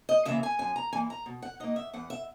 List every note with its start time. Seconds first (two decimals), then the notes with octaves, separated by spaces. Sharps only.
0.09 D#5
0.25 C#3 E3 A#3 E5
0.43 G#5
0.59 F#2 G#5
0.76 A#5
0.93 E3 A#3 E4 G#5
1.10 A#5
1.26 B2
1.42 F#5
1.60 A#3 D#4 D#5
1.76 E5
1.93 E2 F#5
2.10 E5